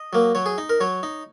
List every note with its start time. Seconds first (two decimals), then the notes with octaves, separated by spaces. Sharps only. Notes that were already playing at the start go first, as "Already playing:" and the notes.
Already playing: D#5
0.13 F#3 A#3
0.35 F#3 C#5
0.46 G#4
0.58 D#4
0.69 A#4
0.80 F#3 C#5
1.03 D#4